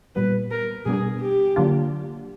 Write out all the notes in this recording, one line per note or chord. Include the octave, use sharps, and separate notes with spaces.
A#2 G3 B3 B4
A#4
B2 G3 B3 D4 G#4
G4
D3 F#3 A#3 D4 F4